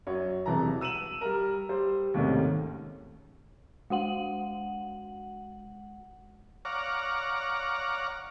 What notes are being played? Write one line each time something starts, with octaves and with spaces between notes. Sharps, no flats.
F#2 F#3 C#5
E1 C3 E3 F#3 A5 A#5
E6 D#7 E7 F#7
G3 A#4
G3 C5
D#2 G#2 C3 D#3 A3 C#4
G#3 F#4 F#5 F#7
C#5 D5 F5 F#5 A#5